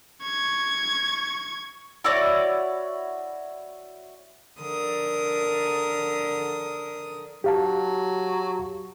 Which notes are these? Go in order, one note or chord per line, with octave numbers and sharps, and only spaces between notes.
C#6 G#6
E4 F#4 C#5 D5
D3 A#4 D#6
F#3 G4 F5 A5